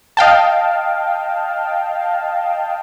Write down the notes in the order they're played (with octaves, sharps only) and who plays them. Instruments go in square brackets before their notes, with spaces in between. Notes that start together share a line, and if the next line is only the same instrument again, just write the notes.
[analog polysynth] D#5 F5 G5 A5